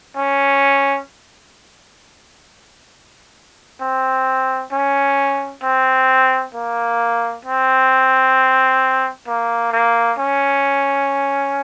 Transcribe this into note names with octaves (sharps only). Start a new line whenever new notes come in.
C#4
C4
C#4
C4
A#3
C4
A#3
A#3
C#4